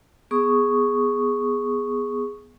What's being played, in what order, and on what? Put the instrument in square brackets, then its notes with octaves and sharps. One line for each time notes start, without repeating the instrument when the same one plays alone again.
[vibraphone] B3 G#4 C#6 D#6